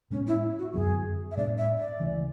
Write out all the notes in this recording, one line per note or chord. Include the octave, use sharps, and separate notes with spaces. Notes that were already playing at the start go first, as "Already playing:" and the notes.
A2 G#3 B3 C#4
E4
F#4
F#2 D3 F#3 B3 G#4
E5
A2 G#3 B3 D4 D5
E5
D5
C#2 C#3 E3 A3